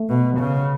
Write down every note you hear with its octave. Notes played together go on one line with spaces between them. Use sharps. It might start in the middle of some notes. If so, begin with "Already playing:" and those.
Already playing: A3
B2
C#3